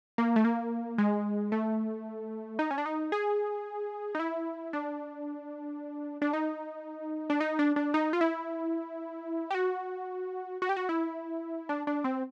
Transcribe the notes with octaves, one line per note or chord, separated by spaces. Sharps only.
A#3
A3
A#3
G#3
A3
D#4
C#4
D4
D#4
G#4
D#4
E4
D4
D4
D#4
D4
D#4
D4
D4
D#4
F4
E4
G4
F#4
F#4
G4
F#4
E4
D4
D4
C4